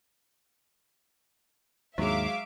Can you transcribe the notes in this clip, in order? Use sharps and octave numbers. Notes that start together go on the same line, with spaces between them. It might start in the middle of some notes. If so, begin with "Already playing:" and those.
D#2 G#2 F#3 G#3 E5 F5 D6